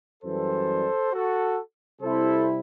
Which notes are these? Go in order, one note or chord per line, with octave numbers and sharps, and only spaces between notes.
F#2 E3 G3 A4 C5
F#4 A4
C3 G3 C4 E4 A4 C5